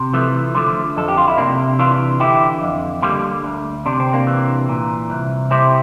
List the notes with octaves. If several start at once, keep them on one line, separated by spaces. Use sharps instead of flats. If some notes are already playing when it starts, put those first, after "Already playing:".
Already playing: C3
E3 F3 A3
D3 F3 A3
F2 A4
G4
F4
E4
C3 A#3 D4
E3 D4 F4
D3 E4 G4
F2
D3 G3 A#3
D2
C3 D4
C4
A#3 D4
E3
A#2
C2
C3 C4 E4